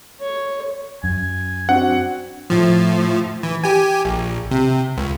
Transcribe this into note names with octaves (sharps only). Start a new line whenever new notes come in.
C#5
F#2 G#5
C4 D4 F#4 F#5
A2 F3
E3
G4 G#5
A#1
C3
C#2